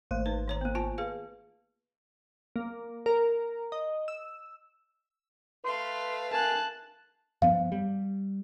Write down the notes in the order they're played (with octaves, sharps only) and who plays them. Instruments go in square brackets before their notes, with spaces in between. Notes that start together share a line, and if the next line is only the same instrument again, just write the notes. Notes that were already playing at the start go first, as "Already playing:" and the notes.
[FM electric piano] G#1 C5 [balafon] A3 A#3
[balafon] D#4 B4
D#3 C#5 A#5
A#3 B3
F4 G#5 A5
G#4 B4 F5
[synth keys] A#3
A#4
D#5
E6
[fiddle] A3 F5 [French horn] B4 [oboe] C6
[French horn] A#4 [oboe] G#5 [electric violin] A5 F#6
[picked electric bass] G2 F3 B3 [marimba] F5
[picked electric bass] G3